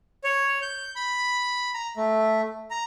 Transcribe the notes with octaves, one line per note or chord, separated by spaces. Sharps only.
C#5
G6
B5
A#5
A3
A#5